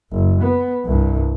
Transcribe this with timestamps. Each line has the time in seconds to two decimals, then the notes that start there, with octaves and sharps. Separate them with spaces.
0.12 F#1
0.43 B3
0.86 C2 G2